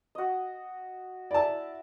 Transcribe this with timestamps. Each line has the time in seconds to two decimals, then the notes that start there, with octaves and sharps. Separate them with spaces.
0.15 F#4 D#5
1.31 E4 D5 E5 A5